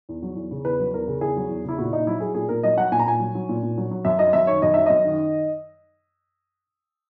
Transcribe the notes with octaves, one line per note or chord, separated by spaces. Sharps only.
E2
F#3
E2
C#3
E2 B4
F#3
E2 A#4
C#3
E2 G#4
F#3
E2
C#3 E4
A#2 F#4
A#2 D#4
F#3 E4
F#3 G#4
A#2 G#4
A#2 A#4
F#3 D#5
F#3 F#5
A#2 G#5
A#5
A#2 G#5
F#3
F#3
A#2
A#2
F#3
F#3
F#2 E5
F#3 D#5
F#2 E5
D#3 C#5
F#2 D#5
F#3 E5
F#2 D#5
D#3